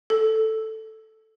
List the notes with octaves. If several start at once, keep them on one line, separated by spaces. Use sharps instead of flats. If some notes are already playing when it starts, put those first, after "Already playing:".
A4